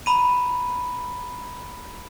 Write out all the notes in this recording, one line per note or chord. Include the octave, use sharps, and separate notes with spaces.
A#5 B5 D#7